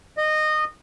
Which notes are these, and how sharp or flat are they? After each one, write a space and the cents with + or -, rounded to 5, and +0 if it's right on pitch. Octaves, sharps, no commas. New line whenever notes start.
D#5 -20